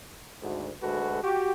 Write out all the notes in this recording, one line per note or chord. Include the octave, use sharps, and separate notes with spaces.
G#1 D2
D2 G#3 F#4 A4 B4
F#4 G4